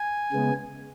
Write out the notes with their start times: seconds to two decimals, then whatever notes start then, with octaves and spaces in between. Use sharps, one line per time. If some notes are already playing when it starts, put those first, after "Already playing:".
Already playing: G#5
0.32 C#3 G#3 B3